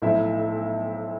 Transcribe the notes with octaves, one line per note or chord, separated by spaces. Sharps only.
B1 A2 F3 C4 E4 E5